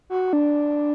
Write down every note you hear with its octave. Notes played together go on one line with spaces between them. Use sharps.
F#4
D4